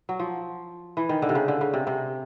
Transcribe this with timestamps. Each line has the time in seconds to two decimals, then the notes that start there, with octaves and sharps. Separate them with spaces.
0.09 F#3
0.19 F3
0.97 E3
1.09 D#3
1.22 D3
1.29 C3
1.35 C#3
1.48 D3
1.61 C#3
1.74 C3
1.87 C3